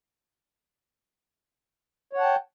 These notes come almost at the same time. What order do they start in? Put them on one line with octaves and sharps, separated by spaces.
C#5 F#5 A5 G5